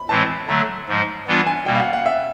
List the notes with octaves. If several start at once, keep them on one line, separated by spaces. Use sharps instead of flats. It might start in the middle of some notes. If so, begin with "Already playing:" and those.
Already playing: B5
A2 E3 G#3 C4 A5
D3 F#3 A3 A#5
G#2 F3 G#3
E3 G3 B3 D4 F4
G#5
B2 G3 A#3 G5
F5
F#5
F#5
E5